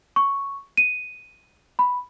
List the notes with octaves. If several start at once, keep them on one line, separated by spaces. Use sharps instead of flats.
C#6
D#7
B5